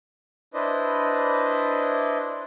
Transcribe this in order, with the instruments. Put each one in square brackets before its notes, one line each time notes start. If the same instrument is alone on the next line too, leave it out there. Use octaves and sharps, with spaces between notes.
[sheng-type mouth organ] D4 E4 B4 C5 D5 D#5